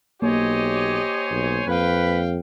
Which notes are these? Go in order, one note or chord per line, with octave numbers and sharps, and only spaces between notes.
B1 A#3 G4 C5 C#5 D#5 G#5
B1
F2 B4 F5 G5